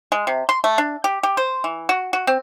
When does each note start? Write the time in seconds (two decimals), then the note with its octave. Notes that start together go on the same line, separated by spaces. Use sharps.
0.12 G#3
0.27 C3
0.49 C6
0.64 A3
0.78 D4
1.04 G4
1.23 G4
1.37 C5
1.64 E3
1.89 F#4
2.13 F#4
2.27 C4